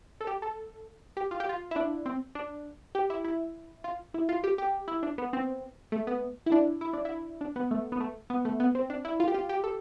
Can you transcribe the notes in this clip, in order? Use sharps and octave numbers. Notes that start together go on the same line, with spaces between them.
A4
G4
A4
G4
F4
G4
F4
E4
D4
C4
D4
G4
E4
E4
F4
E4
F4
G4
G4
E4
D4
B3
C4
A3
B3
E4
D4
E4
D4
E4
D4
B3
A3
B3
A3
B3
A3
B3
C4
D4
E4
F4
G4
F4
G4
A4